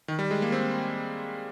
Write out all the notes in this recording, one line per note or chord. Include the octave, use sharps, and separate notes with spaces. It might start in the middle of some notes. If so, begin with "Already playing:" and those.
D#3
G3
G#3
A#3
C4